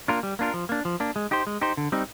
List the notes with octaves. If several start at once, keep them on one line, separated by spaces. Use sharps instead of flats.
A#3 D4 F4 A#4
G3
A#3 D4 F4 A#4
F3
A#3 D4
F3
A#3 D4
G#3
D#4 G4 C5
G#3
D#4 G4 C5
D3
G3 C4 D#4